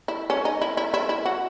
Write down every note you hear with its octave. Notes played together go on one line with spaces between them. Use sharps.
E4
C#4
D#4
E4
E4
E4
E4
F#4